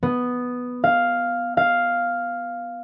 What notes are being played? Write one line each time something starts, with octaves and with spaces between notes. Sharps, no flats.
B3
F5
F5